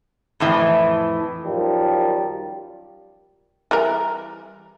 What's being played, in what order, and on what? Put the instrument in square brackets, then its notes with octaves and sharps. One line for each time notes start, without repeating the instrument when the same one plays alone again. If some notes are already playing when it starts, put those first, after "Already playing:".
[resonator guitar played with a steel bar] F2 A2 E3
[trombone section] F#2 D#3 F3 G3
[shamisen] E3 G3 A#4